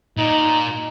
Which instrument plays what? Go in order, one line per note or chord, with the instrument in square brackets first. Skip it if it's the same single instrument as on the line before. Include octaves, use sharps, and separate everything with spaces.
[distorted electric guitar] A#2 [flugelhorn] D#4